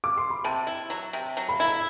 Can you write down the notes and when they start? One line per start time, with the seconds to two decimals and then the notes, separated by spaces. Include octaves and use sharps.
0.04 D6
0.18 C6
0.30 B5
0.44 C3 A5
0.67 E4
0.90 F#3
1.13 C3
1.37 F#3
1.49 B5
1.60 E4